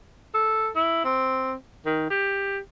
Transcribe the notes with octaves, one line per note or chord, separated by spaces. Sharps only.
A4
E4
C4
D#3
G4